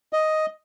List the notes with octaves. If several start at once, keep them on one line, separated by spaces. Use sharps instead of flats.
D#5